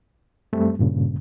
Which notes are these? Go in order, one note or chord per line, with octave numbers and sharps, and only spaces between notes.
F#2 G3 A3 C4
G2 A#2 C#3